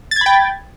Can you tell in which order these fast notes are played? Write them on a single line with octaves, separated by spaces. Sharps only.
A6 G#6 B5 G5